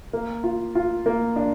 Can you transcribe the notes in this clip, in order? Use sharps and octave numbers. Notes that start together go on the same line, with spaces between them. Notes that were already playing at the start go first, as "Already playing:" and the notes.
A#3
F4
F4
A#3
D4